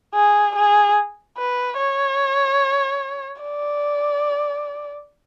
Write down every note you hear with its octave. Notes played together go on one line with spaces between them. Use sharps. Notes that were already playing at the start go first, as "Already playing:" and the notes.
G#4
G#4
B4
C#5
D5